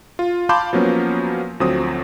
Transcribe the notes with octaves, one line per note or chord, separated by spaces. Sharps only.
F4
F5 A5 B5 C6 D6 G6
F3 F#3 A#3 B3 C#4
D2 F3 F#3 C4 D#6